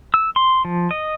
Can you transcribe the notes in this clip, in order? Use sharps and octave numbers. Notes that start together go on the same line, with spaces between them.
E6
C6
F3
D#5